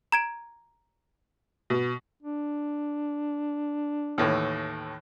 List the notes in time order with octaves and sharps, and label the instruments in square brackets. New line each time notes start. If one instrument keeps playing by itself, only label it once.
[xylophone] A#5 G#6 D7
[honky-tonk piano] B2
[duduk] D4
[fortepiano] D#2 A2 E3